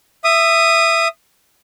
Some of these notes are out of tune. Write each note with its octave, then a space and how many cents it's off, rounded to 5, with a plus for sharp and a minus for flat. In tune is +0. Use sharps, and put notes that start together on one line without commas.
E5 +10 D#6 -10